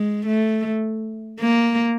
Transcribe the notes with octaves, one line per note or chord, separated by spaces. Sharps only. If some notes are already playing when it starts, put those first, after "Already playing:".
Already playing: G#3
A3
A#3